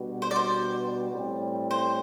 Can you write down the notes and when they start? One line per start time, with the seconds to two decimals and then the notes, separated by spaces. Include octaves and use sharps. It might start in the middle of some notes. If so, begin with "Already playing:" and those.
Already playing: B2 G3 D4 F#4
0.22 C5
0.31 D5
0.36 C5
1.10 A2 G3 C4
1.71 C5